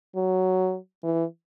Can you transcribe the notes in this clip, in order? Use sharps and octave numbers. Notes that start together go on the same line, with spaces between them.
F#3
E3